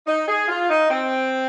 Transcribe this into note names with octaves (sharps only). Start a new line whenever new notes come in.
D#4
G#4
F4
D#4
C4